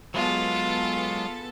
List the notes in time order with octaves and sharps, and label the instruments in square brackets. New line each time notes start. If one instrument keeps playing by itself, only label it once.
[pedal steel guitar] F#3 G#3 [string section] B3 G#4 A4 [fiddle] F4